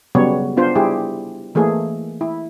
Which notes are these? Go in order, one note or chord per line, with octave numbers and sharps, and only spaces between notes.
C#3 F#3 G3 B3 C#5
B3 D4 F4 C5
G3 E4 G4 G#4
E3 A3 A#3 G#4
E4